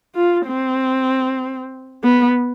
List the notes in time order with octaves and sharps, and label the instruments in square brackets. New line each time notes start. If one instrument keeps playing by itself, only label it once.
[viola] F4
C4
B3